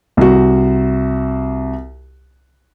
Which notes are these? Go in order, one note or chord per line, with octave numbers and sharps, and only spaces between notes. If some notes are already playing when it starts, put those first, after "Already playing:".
C2 F#4